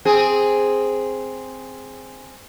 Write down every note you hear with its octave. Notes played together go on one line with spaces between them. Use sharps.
C4 G#4